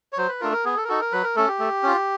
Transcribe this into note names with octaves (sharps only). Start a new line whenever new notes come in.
C#5
F#3 C5
B4
A3 D4 F4 A#4
A#4
B3 G#4
A4
A#4
D#4 F#4 A4
A#4
F#3 B4
A#4
A3 C#4 A4
G4
A3
C#4 F4